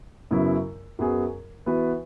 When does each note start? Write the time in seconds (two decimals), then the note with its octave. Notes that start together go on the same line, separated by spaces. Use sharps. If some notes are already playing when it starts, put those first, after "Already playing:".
0.31 F#2 C#3 F#3 B3 E4
0.99 F#2 F#3 B3 G#4
1.66 E3 B3 F#4 B4